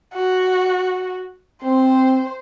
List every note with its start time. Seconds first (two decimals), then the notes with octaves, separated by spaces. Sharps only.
0.13 F#4
1.63 C4 C5